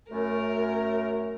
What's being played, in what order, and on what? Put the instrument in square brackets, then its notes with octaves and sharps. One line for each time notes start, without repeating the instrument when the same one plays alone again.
[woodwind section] F#2 A3 [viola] A#4